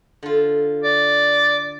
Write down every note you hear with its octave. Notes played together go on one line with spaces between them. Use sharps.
D3 F4
D5